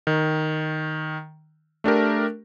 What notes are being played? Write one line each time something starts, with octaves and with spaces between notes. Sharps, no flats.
D#3
A3 D4 G4 A#4